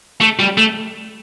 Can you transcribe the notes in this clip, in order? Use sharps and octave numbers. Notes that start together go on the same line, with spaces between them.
A3
G3
A3